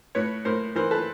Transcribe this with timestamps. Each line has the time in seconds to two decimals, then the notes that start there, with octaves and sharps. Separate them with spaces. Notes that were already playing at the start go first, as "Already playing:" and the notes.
0.15 A2 B4 C#5
0.45 A2 A#4 C5
0.76 E3 A#4 C5
0.91 A4 B4